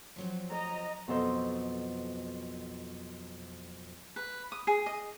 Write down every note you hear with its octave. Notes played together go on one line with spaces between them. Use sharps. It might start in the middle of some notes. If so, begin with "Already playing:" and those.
F3 F#3 C4
D#5 A#5
F2 B2 F#3 A4 C5 D#5
B4
D#6
G#4
D#5